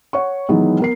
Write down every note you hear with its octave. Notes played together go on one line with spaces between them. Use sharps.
C#5 F#5 C#6
D#3 E3 F#3 G#3 B3
B3 A#4 C7